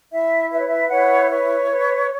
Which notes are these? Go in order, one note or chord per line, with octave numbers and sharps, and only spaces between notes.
E4 E5
B4 E5
C#5
E5
E4 C#5 F#5
B4 C#5
B4